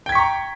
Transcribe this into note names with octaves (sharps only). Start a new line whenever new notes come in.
G5 A#5 C#6 G#6 B6